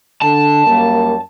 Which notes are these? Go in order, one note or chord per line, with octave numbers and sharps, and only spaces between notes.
D3 A5
F#2 G3 A#3